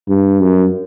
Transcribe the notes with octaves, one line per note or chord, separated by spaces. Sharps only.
G2
F#2